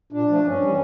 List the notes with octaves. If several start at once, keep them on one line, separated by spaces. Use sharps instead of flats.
A#2 D4
F3 A3
G2 C#4
E3 G3